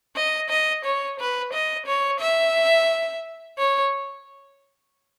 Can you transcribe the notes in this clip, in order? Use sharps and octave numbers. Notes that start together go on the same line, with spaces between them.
D#5
D#5
C#5
B4
D#5
C#5
E5
C#5